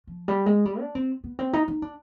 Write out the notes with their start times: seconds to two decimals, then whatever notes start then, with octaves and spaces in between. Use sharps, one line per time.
0.07 F3
0.28 G3
0.46 G#3
0.65 G3
0.80 D4
0.95 C4
1.24 B3
1.39 C4
1.53 D#4
1.68 D#4
1.82 D4